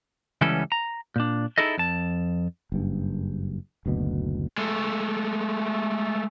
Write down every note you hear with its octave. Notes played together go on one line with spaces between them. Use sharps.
C#2 E3 G3 B3 C#4 A4
A#5
A#2 D4
D#4 E4 G#4 A4 D#5
F2 A5
F#1 G2
F#1 D2 B2
G#3 A3